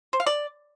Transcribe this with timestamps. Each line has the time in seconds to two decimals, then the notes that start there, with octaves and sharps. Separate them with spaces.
0.13 C5
0.20 F5
0.26 D5